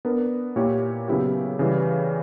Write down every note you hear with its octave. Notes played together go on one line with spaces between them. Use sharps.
B3 D4 A#4
A#2 A#3 E4 G4 C#5
C#3 F#3 B3 E4 G4
C#3 E3 G3